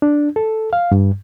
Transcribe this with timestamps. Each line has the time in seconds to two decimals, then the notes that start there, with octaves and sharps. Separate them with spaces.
0.02 D4
0.36 A4
0.73 F5
0.92 G2